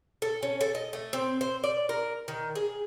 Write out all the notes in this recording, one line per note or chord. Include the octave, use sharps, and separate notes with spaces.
A4
C#4
A4
D#5
A3
C4
C5
D5
A#4
D#3
G#4